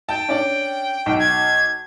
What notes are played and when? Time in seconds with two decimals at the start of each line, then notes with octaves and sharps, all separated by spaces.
0.09 G5 A5
0.29 C#4 D4 D5
1.06 B1
1.19 G#6